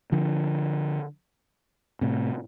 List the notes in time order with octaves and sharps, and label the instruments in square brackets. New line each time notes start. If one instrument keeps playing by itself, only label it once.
[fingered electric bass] D3 F3
A2 C3